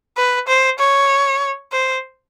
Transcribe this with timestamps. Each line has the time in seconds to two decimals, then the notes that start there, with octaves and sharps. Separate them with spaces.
0.17 B4
0.48 C5
0.79 C#5
1.72 C5